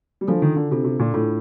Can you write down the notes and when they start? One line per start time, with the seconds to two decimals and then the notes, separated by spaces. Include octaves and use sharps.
0.21 G3
0.28 F3 D4 F4 A4
0.42 D#3
0.56 D3
0.71 C3 D4 F4 A4
0.84 C3
0.99 A#2
1.13 A2 D4 F4 A4